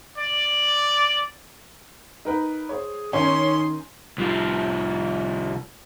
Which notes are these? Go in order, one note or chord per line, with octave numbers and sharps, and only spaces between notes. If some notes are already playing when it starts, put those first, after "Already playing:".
D5
D#4 A#4 B4
G#4 C5 C#5
D#3 C#4 D#4 C#5 G#5 C6
C2 F3